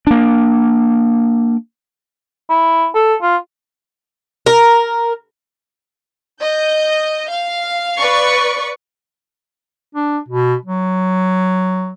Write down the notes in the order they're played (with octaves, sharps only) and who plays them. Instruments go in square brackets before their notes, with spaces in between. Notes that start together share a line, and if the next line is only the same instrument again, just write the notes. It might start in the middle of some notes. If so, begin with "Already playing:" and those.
[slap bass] A#3 D4
[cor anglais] E4
A4
F4
[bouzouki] A#4
[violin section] D#5 G6
F5
[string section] B4 D5 C#6
[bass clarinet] D4
B2
F#3